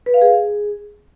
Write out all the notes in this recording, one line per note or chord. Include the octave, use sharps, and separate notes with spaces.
B4
F5
G#4